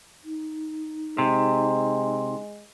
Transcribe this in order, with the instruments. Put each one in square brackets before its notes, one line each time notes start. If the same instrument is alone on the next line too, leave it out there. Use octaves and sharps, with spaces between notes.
[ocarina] D#4
[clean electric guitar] C3 [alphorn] G#3